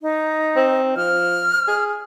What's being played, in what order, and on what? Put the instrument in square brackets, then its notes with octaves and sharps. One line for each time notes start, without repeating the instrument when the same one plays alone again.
[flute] D#4
[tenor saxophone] C4
[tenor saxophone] F3 [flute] F6
[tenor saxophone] G#4